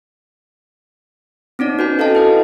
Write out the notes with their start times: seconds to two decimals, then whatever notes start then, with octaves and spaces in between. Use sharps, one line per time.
1.59 C4 C#4 D#4 D5
1.79 F#4 B4 G#5
1.99 A4 D#5 F5 G5 A5
2.15 E4 B4 F5